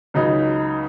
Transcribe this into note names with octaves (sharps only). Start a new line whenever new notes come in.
C#2 C#3 F#3 D#4